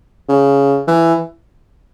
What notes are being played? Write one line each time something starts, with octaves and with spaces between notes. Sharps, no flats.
C#3
E3